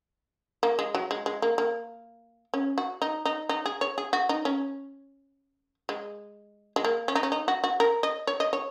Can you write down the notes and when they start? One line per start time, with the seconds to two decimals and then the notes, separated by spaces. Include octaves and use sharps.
0.63 A#3
0.79 G#3
0.95 F#3
1.11 G#3
1.26 G#3
1.42 A#3
1.58 A#3
2.54 C#4
2.78 F#4
3.02 D#4
3.25 D#4
3.49 D#4
3.66 G#4
3.81 C#5
3.98 G#4
4.13 F#4
4.29 D#4
4.45 C#4
5.89 G#3
6.76 G#3
6.84 A#3
7.08 C#4
7.15 D#4
7.23 C#4
7.32 D#4
7.48 F#4
7.64 F#4
7.80 A#4
8.03 D#5
8.27 C#5
8.40 D#5
8.53 C#5